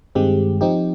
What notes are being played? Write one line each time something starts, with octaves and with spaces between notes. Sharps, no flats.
G2 D#3 G#3 C4 G4
F3 C4 D#4 G4